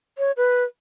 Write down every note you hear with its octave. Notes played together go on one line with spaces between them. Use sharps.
C#5
B4